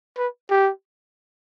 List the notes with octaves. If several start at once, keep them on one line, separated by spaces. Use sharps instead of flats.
B4
G4